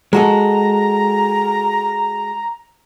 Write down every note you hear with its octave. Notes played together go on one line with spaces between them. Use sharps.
G#3 F#4 A4 A#5